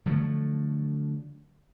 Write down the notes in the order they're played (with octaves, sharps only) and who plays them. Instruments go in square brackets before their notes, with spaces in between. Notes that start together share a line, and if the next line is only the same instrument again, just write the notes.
[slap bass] D3 F3 F#3 A3